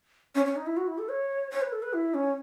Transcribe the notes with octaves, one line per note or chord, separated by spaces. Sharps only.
C#4
C#4
D#4
E4
F#4
E4
A4
C#5
C#5
B4
A4
B4
E4
C#4